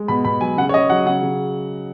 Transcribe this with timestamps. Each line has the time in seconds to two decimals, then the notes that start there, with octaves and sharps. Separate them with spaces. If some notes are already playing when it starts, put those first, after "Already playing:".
Already playing: G#3
0.08 B2 B5
0.25 B2 B5
0.41 F#3 G#5
0.57 C#3 F#5
0.69 C#5
0.74 C#3 D#5
0.90 F#3 F#5
1.06 C#3 F#5
1.23 C#3